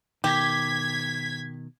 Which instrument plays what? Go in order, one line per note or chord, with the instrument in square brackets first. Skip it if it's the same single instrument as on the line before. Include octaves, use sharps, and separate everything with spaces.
[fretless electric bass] B2 D#3 [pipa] G4 [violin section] G#6 B6